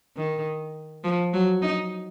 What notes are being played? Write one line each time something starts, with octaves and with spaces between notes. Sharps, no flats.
D#3
F3
F#3
D#4